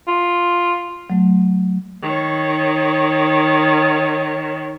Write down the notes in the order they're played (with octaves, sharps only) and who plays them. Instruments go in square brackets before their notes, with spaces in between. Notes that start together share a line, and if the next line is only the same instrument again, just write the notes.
[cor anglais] F4
[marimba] F#3 A3
[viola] D#3 C#5